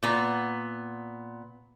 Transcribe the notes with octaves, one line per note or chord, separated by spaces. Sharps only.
A#2 B3 A#5